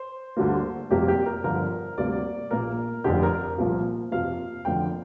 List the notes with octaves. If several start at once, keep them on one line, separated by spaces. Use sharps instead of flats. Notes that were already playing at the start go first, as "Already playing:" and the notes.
Already playing: C5
D2 D3 G3 A#3
F1 F2 C3 G3 A#3 G4
G4
A#4
G1 G2 D3 F3 A#4
D2 C3 G3 A#3 D5
A#1 A#2 A#3 A#4
F1 F2 D3 G4
A#4
C2 A#2 F3 A#3
F2 C3 F3 A#3 F5
F1 F2 D3 F3 A#3 G5